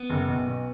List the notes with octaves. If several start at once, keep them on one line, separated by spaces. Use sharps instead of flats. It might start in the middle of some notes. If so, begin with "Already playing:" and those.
Already playing: B3
F#1
B1
B2